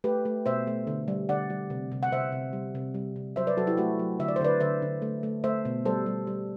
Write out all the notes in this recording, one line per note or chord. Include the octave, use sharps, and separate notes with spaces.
A3 G4 B4
A3
B2 C5 E5
A3
D3
G3
D3 D5 F#5
G3
C3
C3
F#5
C3 C5 E5
C3
G3
C3
G3
C3
F#3 C5 E5
B4 D5
F#3 F#4 A4
E4 G4
A3 F#4 A4
F#3
D3 E5
D5
C5
D3 B4 D5
D3 C5 E5
D3
A3
A3
A3 C5 E5
B2
G3 A4 C5
G3
G3